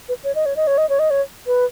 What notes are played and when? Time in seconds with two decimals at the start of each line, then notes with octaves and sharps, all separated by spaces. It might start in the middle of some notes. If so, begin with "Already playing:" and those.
0.09 B4
0.24 C#5
0.35 D#5
0.46 C#5
0.56 D#5
0.67 C#5
0.78 D#5
0.89 C#5
0.99 D#5
1.10 C#5
1.47 B4